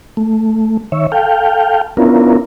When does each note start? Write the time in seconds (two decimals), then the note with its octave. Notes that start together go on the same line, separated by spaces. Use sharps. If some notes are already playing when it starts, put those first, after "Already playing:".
0.17 A3
0.92 D#3 C#5 E5
1.12 A4 F5 G5
1.97 B3 C#4 D4 E4 F4 A#4